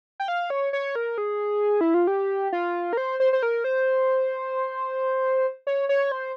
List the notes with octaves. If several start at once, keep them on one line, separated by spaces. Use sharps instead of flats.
G5
F5
C#5
C#5
A#4
G#4
E4
F4
G4
F4
A#4
C5
C5
C5
A#4
C5
C#5
C#5
C5